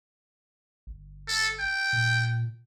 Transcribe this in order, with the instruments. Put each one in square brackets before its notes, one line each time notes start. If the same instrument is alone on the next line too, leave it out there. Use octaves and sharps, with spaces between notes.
[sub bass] G1
[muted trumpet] A4
G5
[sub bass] A#2